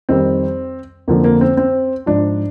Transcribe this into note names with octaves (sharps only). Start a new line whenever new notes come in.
F2 D#3 G3 C4
F2 D3 F3 A#3
A#3
C4
C4
G#2 F3 D4